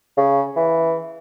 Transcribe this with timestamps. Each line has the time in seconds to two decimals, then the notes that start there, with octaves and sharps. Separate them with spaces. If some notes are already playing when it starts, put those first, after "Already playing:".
0.17 C#3
0.56 E3